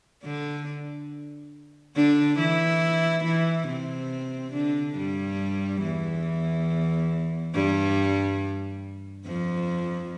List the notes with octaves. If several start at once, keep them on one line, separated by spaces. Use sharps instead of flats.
D3 D4
D3 D4
E3 E4
E3 E4
C3 C4
D3 D4
G2 G3
E2 E3
G2 G3
F2 F3